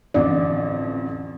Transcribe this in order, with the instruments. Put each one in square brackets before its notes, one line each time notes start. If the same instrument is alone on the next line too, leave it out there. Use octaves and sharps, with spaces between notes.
[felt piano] A1 F2 D3 [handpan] E3 D5